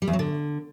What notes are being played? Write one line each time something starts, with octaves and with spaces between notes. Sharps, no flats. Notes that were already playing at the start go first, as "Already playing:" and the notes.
G3
E2
F#3
D3